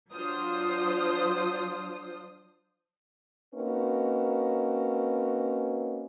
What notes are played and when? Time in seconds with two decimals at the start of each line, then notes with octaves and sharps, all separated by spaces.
0.11 F#3 D4 F4 C5 D#6
3.54 A#3 C4 C#4 D#4 F#4 B4